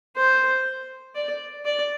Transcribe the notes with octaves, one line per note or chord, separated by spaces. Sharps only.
C5
D5
D5